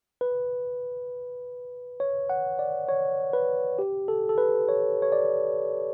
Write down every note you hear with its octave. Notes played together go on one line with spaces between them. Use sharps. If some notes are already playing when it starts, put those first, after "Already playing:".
B4
C#5
F#5
D5
C#5
B4
G4
A4
A4
B4
C#5
C#5
D5